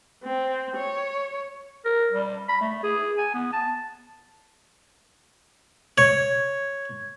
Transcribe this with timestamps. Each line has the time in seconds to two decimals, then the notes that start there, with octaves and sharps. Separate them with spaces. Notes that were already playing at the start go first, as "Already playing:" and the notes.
0.23 C4
0.77 C#5
1.85 A#4
2.12 G3
2.48 B5
2.61 A3
2.83 G#4
3.17 G#5
3.34 B3
3.53 A5
5.98 C#5 G#6